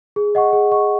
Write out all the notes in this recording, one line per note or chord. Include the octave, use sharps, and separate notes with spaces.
G#4
D#5 F#5 C#6
G#4
D#5 F#5 C#6